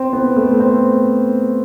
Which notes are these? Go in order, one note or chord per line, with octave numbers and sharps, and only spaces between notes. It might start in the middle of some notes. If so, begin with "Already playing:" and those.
Already playing: C4
B3
A3
C4